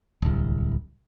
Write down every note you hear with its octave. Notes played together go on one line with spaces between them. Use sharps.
D1 C2